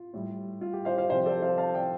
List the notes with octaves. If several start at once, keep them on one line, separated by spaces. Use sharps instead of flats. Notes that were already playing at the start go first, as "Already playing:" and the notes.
Already playing: F4
A2 G3
F4
G4
C5 F5
C5 F5
C3 F3 G4 C5
A4 D5
C5 F5
F5 A5
D5 G5